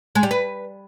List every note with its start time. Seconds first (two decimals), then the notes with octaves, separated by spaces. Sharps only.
0.15 G#3
0.23 G3
0.31 B4